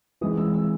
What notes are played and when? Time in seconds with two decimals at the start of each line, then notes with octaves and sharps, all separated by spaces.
0.21 E3 G#3 C4 D#6
0.37 E6
0.54 E6